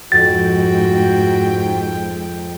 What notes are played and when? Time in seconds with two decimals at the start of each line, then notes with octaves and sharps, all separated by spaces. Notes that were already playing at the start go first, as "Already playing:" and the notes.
0.12 F2 G#2 F#4 G5 A6